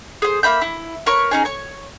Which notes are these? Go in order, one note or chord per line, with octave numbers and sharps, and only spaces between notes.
G#4 C5
A#3 E5 B5 G6
E4
A#4 B4 C#5 C#6
C#4 D#4 G#4
C#5 C#6